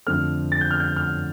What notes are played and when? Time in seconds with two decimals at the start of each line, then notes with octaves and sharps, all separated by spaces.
0.07 F2 D3 F3 A3 C4 F6
0.52 A6
0.61 G6
0.71 F6
0.80 G6
0.96 F6